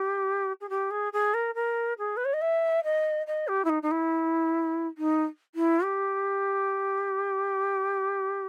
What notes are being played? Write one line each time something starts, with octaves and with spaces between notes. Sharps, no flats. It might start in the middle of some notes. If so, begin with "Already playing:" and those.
Already playing: G4
G#4
G4
G#4
G#4
A#4
A#4
G#4
B4
C#5
D#5
E5
D#5
D#5
G4
E4
D#4
D#4
E4
D#4
E4
G4